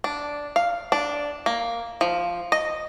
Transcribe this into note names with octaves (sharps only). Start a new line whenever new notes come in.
D4
F5
D4
A#3
F3
D#5